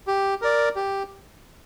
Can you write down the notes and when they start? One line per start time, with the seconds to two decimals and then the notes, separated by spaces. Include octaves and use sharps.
0.07 G4
0.42 A#4 D5
0.75 G4